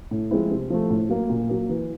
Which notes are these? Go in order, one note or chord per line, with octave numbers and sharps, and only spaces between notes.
A2
F3 G#3 C4 E4
C3
F3 A3
A2
F#3 A#3
A#2
F#3 A#3
E3